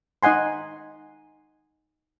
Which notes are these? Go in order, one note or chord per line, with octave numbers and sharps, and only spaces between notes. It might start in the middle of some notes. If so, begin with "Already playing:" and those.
D#4 D#5 F#5 G#5 C6